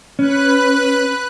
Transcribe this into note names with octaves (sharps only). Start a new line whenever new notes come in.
C#4 B4 F#6